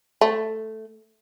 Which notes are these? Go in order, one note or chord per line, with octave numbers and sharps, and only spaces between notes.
A3